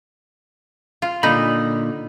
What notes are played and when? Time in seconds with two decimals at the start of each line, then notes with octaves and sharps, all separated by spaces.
1.02 F4
1.23 A#2 D3 D#4 B5